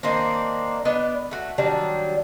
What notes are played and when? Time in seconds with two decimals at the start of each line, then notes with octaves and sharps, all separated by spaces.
0.03 D#3 A#3 C4 D4
0.85 B3 D4 D5 D#5
1.31 A3 F#4
1.58 D#3 F#3 G3 D4